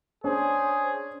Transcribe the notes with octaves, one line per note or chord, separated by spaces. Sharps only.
C#4 D4 G#4 C5